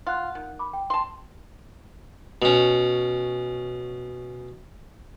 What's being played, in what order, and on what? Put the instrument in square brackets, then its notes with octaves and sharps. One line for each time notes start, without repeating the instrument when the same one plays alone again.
[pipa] F4 [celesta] F#5 F#6
[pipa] D#3
[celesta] B5 D6
G5
[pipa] A5 C6
[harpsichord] B2 C#4